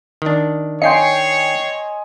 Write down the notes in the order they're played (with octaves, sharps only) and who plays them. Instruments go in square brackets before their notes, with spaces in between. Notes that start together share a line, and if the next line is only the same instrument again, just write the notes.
[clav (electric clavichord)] D#3 D4
[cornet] C#5 [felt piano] D#5 G#5 C6 [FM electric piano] G5 C7 C#7